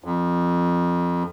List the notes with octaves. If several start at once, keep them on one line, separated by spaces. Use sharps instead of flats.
F2